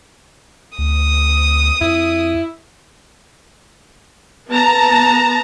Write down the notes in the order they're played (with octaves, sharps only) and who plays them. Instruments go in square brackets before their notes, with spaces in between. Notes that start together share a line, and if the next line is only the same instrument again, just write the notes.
[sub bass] D2 [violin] D#6
[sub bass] F2 [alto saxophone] E4
[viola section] B3 A5 A#5